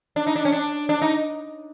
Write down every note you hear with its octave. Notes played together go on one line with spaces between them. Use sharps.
D4
D#4
D4
C#4
D4
D4
D#4